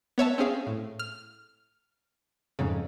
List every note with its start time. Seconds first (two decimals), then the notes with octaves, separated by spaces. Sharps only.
0.18 B3 C#5 E5 A5
0.38 C4 C#4 G#4 F5
0.67 A2
0.99 F6
2.59 F2 G#2 C#3